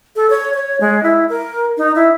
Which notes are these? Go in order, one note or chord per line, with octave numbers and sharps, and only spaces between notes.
A4
C#5
C#5
G#3
E4
A#4
D#4
E4